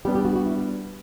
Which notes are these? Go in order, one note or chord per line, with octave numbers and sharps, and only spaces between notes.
G3 B3 D4 G4
G4
F#4
F#4
E4